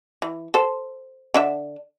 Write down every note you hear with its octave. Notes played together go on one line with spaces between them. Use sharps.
E3
A4 C5
D3 D4 E5